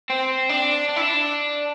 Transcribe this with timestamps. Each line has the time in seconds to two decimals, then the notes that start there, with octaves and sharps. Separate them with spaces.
0.10 C4
0.49 D4
0.89 D4
0.96 E4
1.02 D4